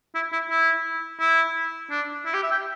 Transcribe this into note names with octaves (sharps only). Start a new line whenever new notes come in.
E4
E4
E4
E4
D4
E4
G4
E5
G5